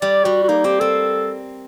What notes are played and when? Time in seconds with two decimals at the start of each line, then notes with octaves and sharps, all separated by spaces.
0.01 G3 D5
0.25 G3 F#4
0.43 F#4
0.49 A#3 D#4
0.64 C4 G4
0.80 C4 A4